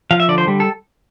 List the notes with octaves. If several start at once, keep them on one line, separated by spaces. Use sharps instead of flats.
F3 F5
E5
D3 D5
C5
G3
A4